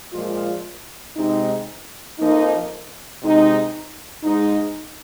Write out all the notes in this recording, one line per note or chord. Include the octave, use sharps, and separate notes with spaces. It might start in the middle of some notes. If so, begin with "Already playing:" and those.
A#2 F3 G#3 F4
C3 G#3 D#4
F2 F3 A#3 D#4
C3 G#3 D#4
G#2 G#3 D#4